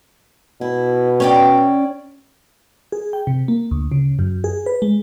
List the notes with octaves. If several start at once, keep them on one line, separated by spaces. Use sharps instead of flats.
B2 E4
C#4 D5 G5
G#4
G5
C3
A#3
D2
C#3
F#2
G#4
B4
G#3